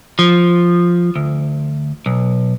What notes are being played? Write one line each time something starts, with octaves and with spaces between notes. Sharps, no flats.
F3
D2
B1